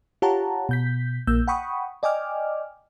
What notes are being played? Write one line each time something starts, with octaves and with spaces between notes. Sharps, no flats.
F4 G4 C#5 F#5 A5 A#5
B2 G6 B6
A#1 A#3 E6 G6
F#5 G5 B5 C#6 D#6
D5 D#5 G5 G#5 D6 F6